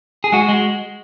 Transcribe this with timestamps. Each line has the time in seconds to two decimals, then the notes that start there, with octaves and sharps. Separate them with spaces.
0.24 G#4
0.32 G#3 F#4
0.49 G#3